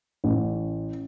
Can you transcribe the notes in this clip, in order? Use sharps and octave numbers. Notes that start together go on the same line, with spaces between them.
A1